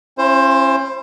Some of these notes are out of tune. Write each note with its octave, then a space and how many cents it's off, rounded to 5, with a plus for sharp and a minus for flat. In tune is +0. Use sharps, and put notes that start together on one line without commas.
C#4 -35 E4 +40 C5 +15